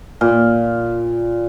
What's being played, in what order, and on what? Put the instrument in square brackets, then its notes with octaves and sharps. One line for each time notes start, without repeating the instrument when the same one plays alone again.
[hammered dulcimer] A#2